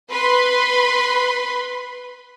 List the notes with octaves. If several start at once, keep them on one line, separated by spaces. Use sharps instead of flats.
B4 B5 C6